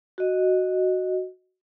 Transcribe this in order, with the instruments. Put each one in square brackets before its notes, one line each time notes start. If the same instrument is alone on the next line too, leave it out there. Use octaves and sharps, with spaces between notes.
[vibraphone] F#4 D#5